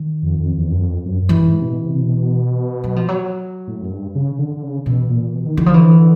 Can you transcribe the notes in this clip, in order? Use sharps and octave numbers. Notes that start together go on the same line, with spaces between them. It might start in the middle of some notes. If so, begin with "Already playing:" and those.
Already playing: D#3
F2
F2
E2
F#2
F2
F#2
F#2
G2 E3
G#2
C3
B2
C3
C3
B2
F#3
F3
F#3
A2
F#2
G2
C#3
D3
D3
C#3
B2 E3
A#2
B2
D#3
D3 E3
F3
E3